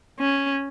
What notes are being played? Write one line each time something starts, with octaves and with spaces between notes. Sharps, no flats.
C#4